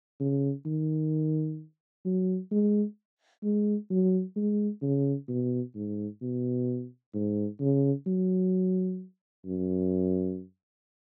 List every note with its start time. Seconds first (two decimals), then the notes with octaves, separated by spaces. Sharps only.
0.20 C#3
0.66 D#3
2.05 F#3
2.51 G#3
3.43 G#3
3.90 F#3
4.36 G#3
4.82 C#3
5.29 B2
5.75 G#2
6.22 B2
7.14 G#2
7.60 C#3
8.07 F#3
9.45 F#2